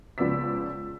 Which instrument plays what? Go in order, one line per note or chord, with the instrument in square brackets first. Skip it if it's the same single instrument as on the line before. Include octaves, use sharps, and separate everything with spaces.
[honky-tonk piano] C#2 F3 B3 D5 E6 B6